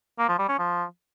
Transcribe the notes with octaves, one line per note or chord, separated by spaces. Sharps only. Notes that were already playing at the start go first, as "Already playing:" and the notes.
A#3
F3
G3
C#4
F3